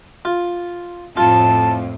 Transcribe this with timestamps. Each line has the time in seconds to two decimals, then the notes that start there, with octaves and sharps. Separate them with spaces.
0.25 F4
1.17 F2 A2 F4 A5